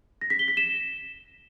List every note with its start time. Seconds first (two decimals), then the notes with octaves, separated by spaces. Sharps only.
0.21 A#6
0.30 B6
0.39 G7
0.48 B6
0.57 E7